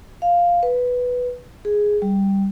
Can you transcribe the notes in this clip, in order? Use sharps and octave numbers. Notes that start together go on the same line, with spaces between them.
F5
B4
G#4
G3